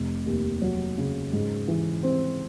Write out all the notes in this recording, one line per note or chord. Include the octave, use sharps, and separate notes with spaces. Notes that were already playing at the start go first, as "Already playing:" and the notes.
Already playing: F1
D#2
F#3
C#3
G#2
E3
C4